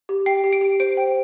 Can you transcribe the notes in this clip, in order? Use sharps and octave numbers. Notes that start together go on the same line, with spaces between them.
G4
G5 C7
G4
D7
G4
C5 D7
G5